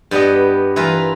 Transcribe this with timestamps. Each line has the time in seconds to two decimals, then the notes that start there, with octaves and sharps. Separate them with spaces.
0.11 G2 G3 B3 G4 D#5
0.76 E3 F4 A#4 B4